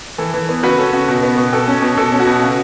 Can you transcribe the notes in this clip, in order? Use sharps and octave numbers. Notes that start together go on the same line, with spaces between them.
E3 A4
E3
B3
C#3 F#4 B4
C#4 A4
C#3 F#4
B2
B3
B2
B2 A4
C#4
B2
B2 A4
C#4
F#4
B2
C#3